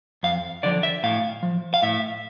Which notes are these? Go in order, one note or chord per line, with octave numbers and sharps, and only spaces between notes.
F2 F5
D3 F3 D5
E5
A2 F5
F3
F5
A2 E5